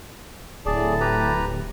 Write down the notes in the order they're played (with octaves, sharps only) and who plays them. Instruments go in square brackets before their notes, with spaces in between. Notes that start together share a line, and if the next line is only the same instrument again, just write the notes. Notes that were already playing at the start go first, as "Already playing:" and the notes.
[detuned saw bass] D1 [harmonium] A2 A5 [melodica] G#4 D5
[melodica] G4 B4 A#5